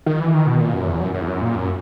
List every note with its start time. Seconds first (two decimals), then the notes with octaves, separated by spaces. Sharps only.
0.06 D#3
0.20 E3
0.34 D#3
0.47 B2
0.60 A#2
0.74 F#2
0.87 E2
1.00 F#2
1.14 F#2
1.21 E2
1.28 F#2
1.41 A#2
1.55 F#2